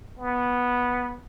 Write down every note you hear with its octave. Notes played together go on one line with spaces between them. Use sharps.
B3